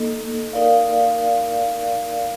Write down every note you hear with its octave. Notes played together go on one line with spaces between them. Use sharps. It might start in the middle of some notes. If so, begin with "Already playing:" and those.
Already playing: A#3 D#4 A4 D#5
D#4 A#4 D5 F5